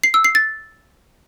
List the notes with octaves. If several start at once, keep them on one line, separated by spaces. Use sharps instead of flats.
C7
E6
C7
A6